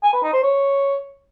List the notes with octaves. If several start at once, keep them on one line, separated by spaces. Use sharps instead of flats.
G#5
B4
D#4
C5
C#5